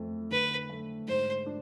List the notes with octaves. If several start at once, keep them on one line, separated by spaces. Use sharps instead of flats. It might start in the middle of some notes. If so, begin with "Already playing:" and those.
Already playing: F2 A3
D3 B4
A3
G#2 C5
D4